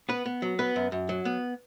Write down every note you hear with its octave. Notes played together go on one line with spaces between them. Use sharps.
B3 B4
B3
F#3
B3 B4
F#2
F#2
F#3
B3